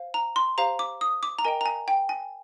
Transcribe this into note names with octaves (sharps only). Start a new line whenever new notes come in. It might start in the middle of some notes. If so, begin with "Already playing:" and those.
Already playing: C5 F5
A#5
C6
G4 C5 F5 A#5
D6
D#6
D6
A#5
A#4 D#5 G5 G#5
A#5
G#5
G5
G#5